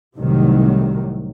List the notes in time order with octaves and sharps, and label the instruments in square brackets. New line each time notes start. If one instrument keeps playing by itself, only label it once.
[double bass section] C2 A2 C3 D#3 F#3